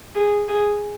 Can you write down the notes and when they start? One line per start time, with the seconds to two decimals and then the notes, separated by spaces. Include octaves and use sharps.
0.15 G#4
0.49 G#4